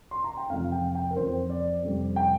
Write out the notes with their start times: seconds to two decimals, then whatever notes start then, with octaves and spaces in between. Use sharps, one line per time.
0.11 C6
0.24 A#5
0.37 G5
0.50 F2 C3 F3 F5
0.72 G5
0.95 G5
1.11 A#4
1.16 F2 F3 C4 C5
1.50 D5
1.83 F2 C3 G3 C4
2.16 G5